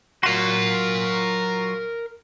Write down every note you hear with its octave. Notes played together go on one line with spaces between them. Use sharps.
F#3 F4 F#4 A#4 C6